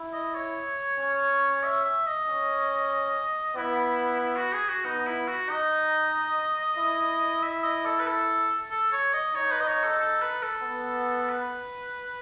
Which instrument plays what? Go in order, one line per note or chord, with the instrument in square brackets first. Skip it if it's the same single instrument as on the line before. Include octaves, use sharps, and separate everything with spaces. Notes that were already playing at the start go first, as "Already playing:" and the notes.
Already playing: [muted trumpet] E4
[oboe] D#5
C#5
[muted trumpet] C#4
[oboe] E5
E5
D#5
[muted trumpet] C#4
[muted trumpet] B3 [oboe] E4
[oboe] E4
F#4
G#4
F#4
[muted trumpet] B3 [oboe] D#4
[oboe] E4
F#4
[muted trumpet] D#4 [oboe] D#5
[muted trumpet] E4
[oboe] E5
D#5
A4
B4
A4
A4
C#5
D#5
[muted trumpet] D#4 [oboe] C#5
[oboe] B4
D#5
C#5
A4
A4
B4
A4
[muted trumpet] B3
[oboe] B4